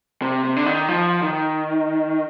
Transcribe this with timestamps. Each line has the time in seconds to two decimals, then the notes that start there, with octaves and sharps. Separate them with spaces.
0.22 C3
0.44 C3
0.56 D3
0.66 D#3
0.89 F3
1.22 D#3